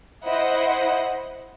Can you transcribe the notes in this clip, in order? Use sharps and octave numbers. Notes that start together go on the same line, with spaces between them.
E4 C5 D#5 F#5